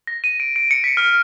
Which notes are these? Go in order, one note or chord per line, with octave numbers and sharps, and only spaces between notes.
A#6
D#7
D7
D7
C#7
B6
F6